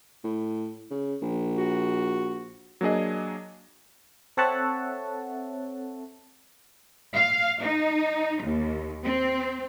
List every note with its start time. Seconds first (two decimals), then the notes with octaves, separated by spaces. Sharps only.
0.24 A2
0.91 C#3
1.22 A#1
1.57 F#4
2.81 F#3 A#3 D4 G#4 D#5
4.37 C4 A4 C#5 E5 F#5 A5
7.14 F5
7.62 D#4
8.42 D#2
9.04 C4